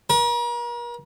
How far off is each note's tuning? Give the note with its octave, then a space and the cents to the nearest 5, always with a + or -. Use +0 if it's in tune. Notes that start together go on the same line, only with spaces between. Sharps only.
A#4 +40